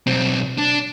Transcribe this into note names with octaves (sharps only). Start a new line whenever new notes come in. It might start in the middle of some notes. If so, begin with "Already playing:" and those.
B1 C4
D4